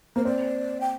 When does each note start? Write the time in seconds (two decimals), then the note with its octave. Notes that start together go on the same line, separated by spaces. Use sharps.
0.16 A#3 C5
0.25 C4 D5
0.81 G5